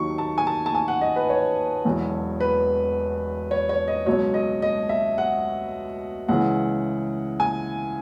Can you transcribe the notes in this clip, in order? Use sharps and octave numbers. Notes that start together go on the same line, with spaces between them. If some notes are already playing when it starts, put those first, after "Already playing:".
Already playing: D#2 D#3 F#3 C#6
A5
G#5
A5
A5
G#5
F#5
D#5
B4
C#5
E1 E2 B2 F#3
B4
C#5
C#5
D#5
C#2 B2 F#3 C#5
D#5
D#5
E5
F#5
C#2 C#3 E3 F#5
G#5